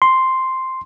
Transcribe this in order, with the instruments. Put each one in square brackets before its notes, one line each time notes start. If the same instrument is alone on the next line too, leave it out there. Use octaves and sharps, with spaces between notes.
[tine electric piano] C6